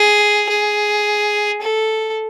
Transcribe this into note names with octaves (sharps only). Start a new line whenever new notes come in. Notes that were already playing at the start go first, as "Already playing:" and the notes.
Already playing: G#4
G#4
A4